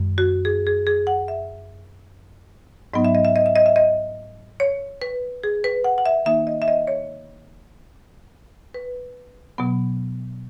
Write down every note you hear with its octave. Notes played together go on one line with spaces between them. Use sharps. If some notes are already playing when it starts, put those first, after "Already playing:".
Already playing: F#2 D#3 G#3
F#4
G#4
G#4
G#4
F#5
E5
G#2 F#3 B3 D#4 D#5
E5
D#5
E5
D#5
E5
D#5
E5
D#5
C#5
B4
G#4
B4
F#5
F#5
E5
D#3 A#3 D#4 E5
D#5
E5
D#5
C#5
B4
B2 F#3 B3